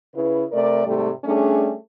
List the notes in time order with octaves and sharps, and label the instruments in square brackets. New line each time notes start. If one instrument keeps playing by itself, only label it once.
[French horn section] C#3 E4 B4
C3 A3 A#4 D5
G#2 C3 G3 A3
G3 A3 C#4 D4 G#4